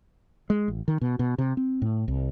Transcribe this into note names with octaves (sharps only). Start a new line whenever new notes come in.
G#3
A1
D#3
B2
B2
C3
C4
A2
C2